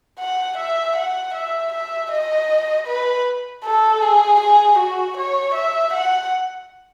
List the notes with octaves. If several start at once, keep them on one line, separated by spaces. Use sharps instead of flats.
F#5
E5
F#5
E5
E5
D#5
B4
A4
G#4
G#4
F#4
C#5
E5
F#5